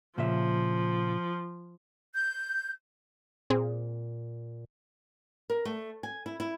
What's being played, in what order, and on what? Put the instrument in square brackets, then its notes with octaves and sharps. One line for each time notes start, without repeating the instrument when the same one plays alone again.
[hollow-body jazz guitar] A#2 C#3 E5 [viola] F3
[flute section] G6
[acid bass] A#2 [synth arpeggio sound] C4 G#4
[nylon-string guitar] A#4
A3
G#5
E4
E4